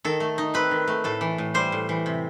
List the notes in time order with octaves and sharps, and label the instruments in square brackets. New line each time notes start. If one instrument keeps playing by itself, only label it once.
[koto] D#3 A4
A3
D#4
C4 B4
D#3
A3
A2 A4
E3
A2
G3 C5
A2
E3
C3